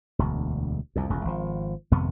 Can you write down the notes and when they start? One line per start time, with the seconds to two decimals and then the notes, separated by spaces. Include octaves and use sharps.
0.19 E1 D2
0.96 C2 F2
1.10 E1 C#2
1.25 G#1 F3
1.91 G#1 F2 C3 B3